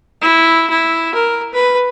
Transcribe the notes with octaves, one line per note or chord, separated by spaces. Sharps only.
E4
E4
A#4
B4